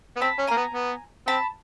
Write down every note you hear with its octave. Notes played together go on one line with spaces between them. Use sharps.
B3
C4 A5 B5
C#4
A#3 G#5 A#5
B3
B3
C4 A5 B5